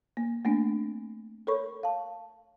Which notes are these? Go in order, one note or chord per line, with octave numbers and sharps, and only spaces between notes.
A#3
A3 A#3 C4 D4
A4 A#4 C#5 B5 C#6
F5 A5